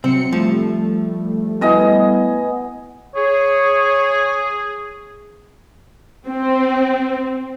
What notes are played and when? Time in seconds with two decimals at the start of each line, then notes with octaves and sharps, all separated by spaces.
0.04 C3 F#3 C4 C#7
0.32 F3 G3 A3
1.61 B2 B3 E4 D#5 G#5
3.16 G#4 C#5
6.27 C4